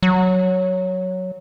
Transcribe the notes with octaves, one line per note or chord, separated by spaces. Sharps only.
F#3